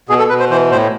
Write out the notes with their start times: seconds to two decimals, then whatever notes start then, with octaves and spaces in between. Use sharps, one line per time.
0.09 B2 G#4
0.19 A4
0.29 B2 B4
0.40 C5
0.50 E3 C5
0.71 A2 C5